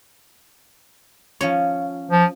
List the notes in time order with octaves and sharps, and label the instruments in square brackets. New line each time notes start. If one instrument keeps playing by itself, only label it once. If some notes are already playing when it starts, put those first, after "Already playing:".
[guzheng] F3 C#4 C#5
[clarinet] F3